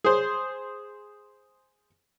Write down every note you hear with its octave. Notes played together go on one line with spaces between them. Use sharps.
G#4 C5